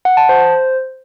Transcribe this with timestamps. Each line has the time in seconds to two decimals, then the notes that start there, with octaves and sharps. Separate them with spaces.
0.05 F#5
0.17 A5
0.29 C5